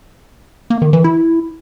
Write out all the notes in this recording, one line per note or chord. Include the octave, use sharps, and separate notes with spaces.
A#3
D#3
E3
E4